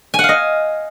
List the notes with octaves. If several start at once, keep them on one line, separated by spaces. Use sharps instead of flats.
G#5
F#5
F5
D#5